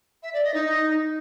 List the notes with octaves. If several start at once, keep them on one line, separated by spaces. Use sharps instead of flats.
E5
D5
D#5
D#4